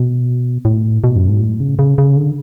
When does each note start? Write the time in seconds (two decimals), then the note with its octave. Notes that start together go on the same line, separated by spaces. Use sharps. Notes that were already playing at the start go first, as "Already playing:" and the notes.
Already playing: B2
0.65 A2
1.04 B2
1.16 F#2
1.29 G#2
1.40 A2
1.60 C#3
1.79 C#3
1.98 C#3
2.17 D3